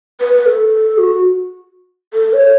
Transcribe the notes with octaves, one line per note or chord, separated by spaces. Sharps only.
B4
B4
A4
F#4
A4
C#5